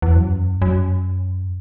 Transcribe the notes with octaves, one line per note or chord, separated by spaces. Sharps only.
E2
F#2
F#2